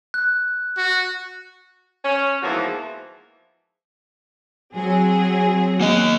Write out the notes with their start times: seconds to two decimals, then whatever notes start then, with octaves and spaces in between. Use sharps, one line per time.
0.14 F#6
0.78 F#4
2.04 C#4
2.43 E2 G#2 E3 F3 A#3 F#4
4.76 F#3 C4 G#4
5.81 A#3 D#5